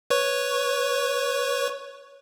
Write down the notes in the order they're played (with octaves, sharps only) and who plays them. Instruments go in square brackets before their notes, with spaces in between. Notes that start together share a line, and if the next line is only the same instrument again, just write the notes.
[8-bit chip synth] B4 C#5 C#6